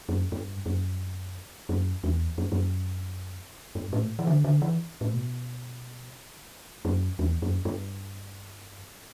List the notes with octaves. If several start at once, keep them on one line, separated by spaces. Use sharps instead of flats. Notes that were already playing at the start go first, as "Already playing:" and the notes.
F#2
G2
F#2
F#2
E2
F#2
G2
F#2
G2
A2
E3
D3
D3
E3
A2
B2
F#2
E2
F#2
G2